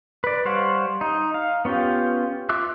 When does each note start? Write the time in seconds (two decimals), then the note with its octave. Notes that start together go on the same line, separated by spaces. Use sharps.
0.24 B4 D5
0.45 G3 C5 C#5 F5 F#5
1.01 D#4
1.34 F5
1.65 B3 C#4 F4 G4
2.49 F4 E5 D6 E6 F#6